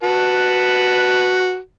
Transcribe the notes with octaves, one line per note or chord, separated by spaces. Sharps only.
F#4 B4 A5